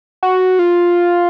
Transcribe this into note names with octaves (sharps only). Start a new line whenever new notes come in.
F#4
F4